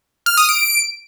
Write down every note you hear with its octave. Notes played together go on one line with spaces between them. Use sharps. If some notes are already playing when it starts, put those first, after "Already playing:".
F6
D#6
D7